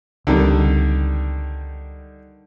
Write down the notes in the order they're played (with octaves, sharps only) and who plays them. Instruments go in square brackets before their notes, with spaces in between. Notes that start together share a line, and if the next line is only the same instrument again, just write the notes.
[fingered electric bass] C#2 C4 [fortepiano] D3 D#3 G3